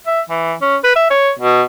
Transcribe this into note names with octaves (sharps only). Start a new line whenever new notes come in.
E5
E3
C#4
B4
E5
C#5
B2